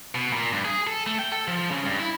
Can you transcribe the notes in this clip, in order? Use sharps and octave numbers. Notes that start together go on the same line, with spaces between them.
B2
A#2
G2
G#4
A4
A3
G5
A4
F3
C#3
G2
E4